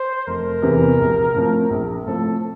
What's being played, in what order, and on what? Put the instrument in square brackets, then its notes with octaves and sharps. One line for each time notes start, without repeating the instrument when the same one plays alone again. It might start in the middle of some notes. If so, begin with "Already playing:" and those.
Already playing: [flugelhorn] C5
[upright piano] F1 [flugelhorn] A#4
[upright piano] E2 C3 E3
A#1
A2 F3 C4
A#1
[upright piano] A2 F3 C4 [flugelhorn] A4